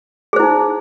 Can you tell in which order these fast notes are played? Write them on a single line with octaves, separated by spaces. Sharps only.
G#4 C5 E4 D#4